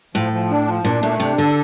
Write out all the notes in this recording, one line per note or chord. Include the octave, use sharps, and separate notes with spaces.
A2 F3
F3
D4
F3
A#2 D4
A#2 A3
C3 D4
D3 A4